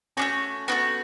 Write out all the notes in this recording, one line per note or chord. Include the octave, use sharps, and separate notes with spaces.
A3 C#4 D4 F#4
A3 B3 D4 F#4